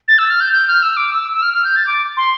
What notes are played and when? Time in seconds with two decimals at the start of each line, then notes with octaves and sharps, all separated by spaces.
0.08 A6
0.18 E6
0.30 F6
0.41 G6
0.53 G6
0.68 F6
0.83 E6
0.97 D6
1.12 E6
1.34 E6
1.42 F6
1.54 F6
1.64 G6
1.76 A6
1.87 D6
2.17 C6